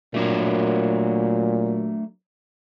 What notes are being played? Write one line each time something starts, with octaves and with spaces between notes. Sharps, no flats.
A#2 F#3 A3 D4 A#4